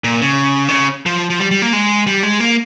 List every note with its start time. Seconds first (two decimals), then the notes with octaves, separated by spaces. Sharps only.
0.04 A#2
0.22 C#3
0.68 D#3
0.72 C#3
1.06 F3
1.30 F3
1.39 G3
1.51 G3
1.62 A#3
1.73 G#3
2.07 G3
2.23 G#3
2.40 A#3